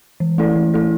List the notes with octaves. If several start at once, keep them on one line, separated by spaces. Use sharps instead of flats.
E3
A3 E4 A4 D5
E3
A3 E4 A4 D5